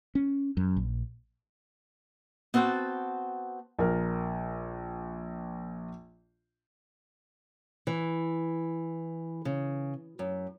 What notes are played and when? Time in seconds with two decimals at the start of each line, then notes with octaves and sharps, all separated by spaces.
0.15 C#4
0.57 F#2
0.77 A#1
2.54 B3 C4 F#4 G5 A5
3.79 A#1 A#4
7.87 E3
9.45 C#3
10.19 F#2